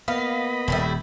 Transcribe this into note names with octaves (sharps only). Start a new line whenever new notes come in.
A#3 B3 D#5 F5 B5
D#1 A2 G3 E4